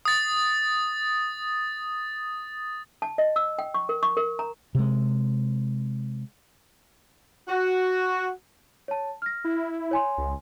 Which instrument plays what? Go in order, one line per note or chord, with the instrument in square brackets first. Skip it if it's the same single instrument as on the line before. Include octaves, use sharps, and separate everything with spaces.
[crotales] D#6 A6
[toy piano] A5
D#5
E6
G5
C#6
A#4
C#6
A#4
A#5
[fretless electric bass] C3 G#3
[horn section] F#4
[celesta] C#5 A5
F6 A#6
[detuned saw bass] E4
[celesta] C#5 G#5 C6
[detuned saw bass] C#2